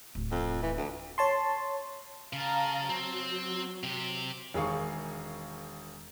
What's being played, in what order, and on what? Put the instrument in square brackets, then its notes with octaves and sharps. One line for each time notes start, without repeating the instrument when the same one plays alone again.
[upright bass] D1
[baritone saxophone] F2
E3
D2
[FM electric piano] C#5 A5 C6
[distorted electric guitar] C#3 [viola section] F5 A5 A#5
[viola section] F#3 [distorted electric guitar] C4
[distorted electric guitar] C3 G4
[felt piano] E1 D#3 G#4 F5 C#6